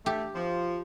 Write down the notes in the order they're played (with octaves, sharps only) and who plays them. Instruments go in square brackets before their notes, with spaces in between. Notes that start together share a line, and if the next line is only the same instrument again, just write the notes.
[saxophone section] A3 [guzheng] G4
[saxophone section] F3